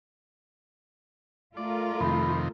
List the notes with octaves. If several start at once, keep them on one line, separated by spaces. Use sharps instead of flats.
A3 F4 A#4 D5
F2 C3 D#3 B5